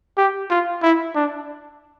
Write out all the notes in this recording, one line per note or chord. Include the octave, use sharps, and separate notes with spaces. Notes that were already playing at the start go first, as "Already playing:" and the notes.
G4
F4
E4
D4